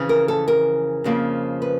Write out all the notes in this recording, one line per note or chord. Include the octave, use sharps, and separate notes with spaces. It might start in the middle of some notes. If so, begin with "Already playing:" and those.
Already playing: F2 C#3 E3
A#4
A4
A#4
F2 C#3 F3 A#3
B4